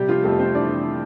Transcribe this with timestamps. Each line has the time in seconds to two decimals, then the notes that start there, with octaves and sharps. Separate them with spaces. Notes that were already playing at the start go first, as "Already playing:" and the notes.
Already playing: C3 G3 G4
0.09 F3 F4
0.24 F2 A3 A4
0.39 C4 C5
0.54 E3 D4 D5